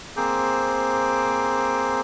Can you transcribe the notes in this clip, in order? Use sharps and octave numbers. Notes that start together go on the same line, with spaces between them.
A#3 C4 G#4 C5 D6